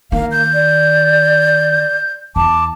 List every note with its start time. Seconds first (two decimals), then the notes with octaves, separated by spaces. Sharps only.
0.12 D#3 A#3 F5
0.32 G6
0.54 D5
2.36 E2 A5 D6